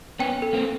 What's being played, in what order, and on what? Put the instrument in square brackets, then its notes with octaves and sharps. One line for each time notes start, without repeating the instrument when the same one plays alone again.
[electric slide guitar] B3 C#4 [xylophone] G5
[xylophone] A4
[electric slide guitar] A#3 C4